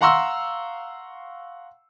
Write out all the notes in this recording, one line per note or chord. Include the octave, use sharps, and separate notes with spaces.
F5 F#5 A#5 C6 C#6 E6